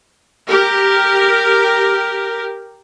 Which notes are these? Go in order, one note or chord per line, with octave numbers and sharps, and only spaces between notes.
G4 A#4